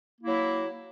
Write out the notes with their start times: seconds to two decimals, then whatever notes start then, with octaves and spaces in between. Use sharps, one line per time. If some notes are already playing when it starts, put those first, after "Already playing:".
0.20 A#3
0.24 E4
0.27 F#3